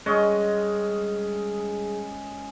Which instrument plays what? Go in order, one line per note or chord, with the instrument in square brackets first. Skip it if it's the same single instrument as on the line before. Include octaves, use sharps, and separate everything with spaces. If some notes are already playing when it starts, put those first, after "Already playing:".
[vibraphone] G3 G#4 [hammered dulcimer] G#3 C#4 D#5